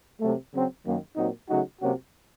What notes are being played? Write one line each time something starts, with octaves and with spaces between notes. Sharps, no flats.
C3 F#3 A3
C#3 F#3 C4
F#2 D#3 F#3 A#3
A#2 F#3 C4 D#4 F#4
C#3 F#3 A3 D#4 F#4
C3 F#3 A#3 C#4 F#4